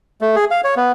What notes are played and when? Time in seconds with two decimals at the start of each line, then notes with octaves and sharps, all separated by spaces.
0.21 A3
0.36 G#4
0.51 F5
0.64 C#5
0.77 B3